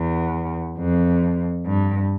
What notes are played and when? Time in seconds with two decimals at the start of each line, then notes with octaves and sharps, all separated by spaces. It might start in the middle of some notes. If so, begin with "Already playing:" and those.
Already playing: E2
0.78 F2
1.66 G2